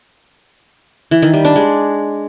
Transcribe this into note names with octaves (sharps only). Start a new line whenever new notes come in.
E3
D#3
G3
D4
G#3